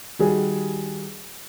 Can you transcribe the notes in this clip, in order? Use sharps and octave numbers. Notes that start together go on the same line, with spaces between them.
D#3 G3 F#4 G#4